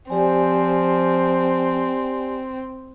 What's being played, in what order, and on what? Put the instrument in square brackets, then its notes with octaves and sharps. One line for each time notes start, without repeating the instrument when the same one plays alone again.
[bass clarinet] F3 [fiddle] C4 [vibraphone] G4 D5 G#5